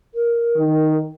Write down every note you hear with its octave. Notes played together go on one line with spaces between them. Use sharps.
A#4
D#3